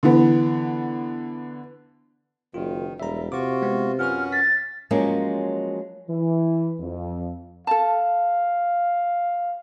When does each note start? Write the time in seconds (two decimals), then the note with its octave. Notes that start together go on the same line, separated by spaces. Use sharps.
0.03 D3 E3 B3
2.54 F#1 D#3 F4
3.00 E1 G3 E5 A#5
3.32 C3 F4 F#4 C#6 D6
3.62 G#3 B3 C4
3.99 F#2 C#4 F4 B4 F#5 C#6 F6
4.32 A6 B6
4.91 F3 F#3 G#3 A#3 C#4
6.09 E3
6.80 F2
7.67 A4 F5 A5